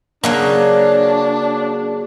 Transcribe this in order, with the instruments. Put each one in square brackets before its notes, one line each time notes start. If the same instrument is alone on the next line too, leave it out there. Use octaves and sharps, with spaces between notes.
[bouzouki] C#3 F#3 A#3 [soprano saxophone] D4